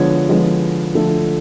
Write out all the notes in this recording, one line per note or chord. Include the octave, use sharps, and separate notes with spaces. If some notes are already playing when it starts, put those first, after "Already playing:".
Already playing: D3 F3 G#3 B3 C#5
D3 F3 G#3 B3
D3 F3 A3